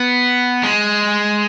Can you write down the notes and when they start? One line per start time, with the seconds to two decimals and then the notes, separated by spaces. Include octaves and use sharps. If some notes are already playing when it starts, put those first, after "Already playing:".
Already playing: B3
0.63 G#3